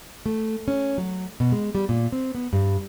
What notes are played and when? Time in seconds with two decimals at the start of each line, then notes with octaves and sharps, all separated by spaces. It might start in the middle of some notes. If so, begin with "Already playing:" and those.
0.26 A3
0.68 C#4
0.98 F#3
1.40 B2
1.52 G#3
1.75 G3
1.89 A#2
2.12 C4
2.35 B3
2.53 G2